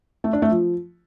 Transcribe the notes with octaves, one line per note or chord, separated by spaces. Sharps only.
A3
D4
A3
F3